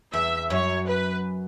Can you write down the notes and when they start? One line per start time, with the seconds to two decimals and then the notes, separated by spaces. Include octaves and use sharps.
0.13 E2 E5
0.50 F#2 C#5
0.87 B4